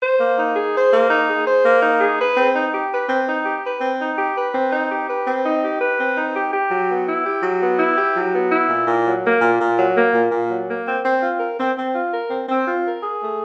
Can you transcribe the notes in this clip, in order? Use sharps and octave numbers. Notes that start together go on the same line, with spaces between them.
C5
A#3
D#4
G#4
C5
A#3
D#4
G#4
C5
A#3
D#4
G#4
B4
C4
D#4
G4
B4
C4
D#4
G4
B4
C4
D#4
G4
B4
C4
D#4
G4
B4
C4
D#4
G4
B4
C4
D#4
G4
G4
F#3
B3
E4
G4
F#3
B3
E4
G4
F#3
B3
E4
A#2
A#2
F#3
A#3
A#2
A#2
F#3
A#3
A#2
A#2
F#3
A#3
C4
C4
F4
A#4
C4
C4
F4
A#4
C4
C4
F4
A#4
G#4
A3